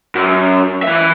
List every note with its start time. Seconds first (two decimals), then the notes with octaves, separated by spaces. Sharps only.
0.15 F#2
0.83 E3 E5